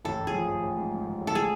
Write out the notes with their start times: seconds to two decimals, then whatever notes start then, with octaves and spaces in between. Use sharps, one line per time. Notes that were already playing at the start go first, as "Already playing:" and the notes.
0.05 A1 A4
0.20 A1
0.27 G#4
0.34 F3
0.48 A1
0.63 A1
0.78 G#2
0.92 G#2
1.07 A1
1.21 A1
1.27 A4
1.35 F3 G#4